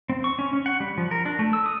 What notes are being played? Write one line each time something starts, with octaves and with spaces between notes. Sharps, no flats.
C4
C#6
C#4
C#4
F#5
G3
F3
A#4
D4
A3
E6
D#6